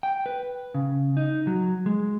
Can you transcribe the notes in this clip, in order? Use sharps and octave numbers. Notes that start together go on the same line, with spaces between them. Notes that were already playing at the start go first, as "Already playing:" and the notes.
G5
B4
C#3
D#4
F#3
G#3